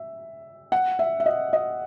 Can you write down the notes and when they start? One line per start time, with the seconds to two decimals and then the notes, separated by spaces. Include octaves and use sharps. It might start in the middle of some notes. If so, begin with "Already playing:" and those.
Already playing: E5
0.72 F#5
0.99 E5
1.20 E5
1.26 D#5
1.53 D#5